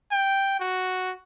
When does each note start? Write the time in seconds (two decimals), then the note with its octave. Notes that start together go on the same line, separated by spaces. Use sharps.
0.12 G5
0.60 F#4